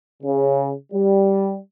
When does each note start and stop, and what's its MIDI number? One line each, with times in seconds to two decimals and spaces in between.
0.23 0.72 49
0.92 1.58 55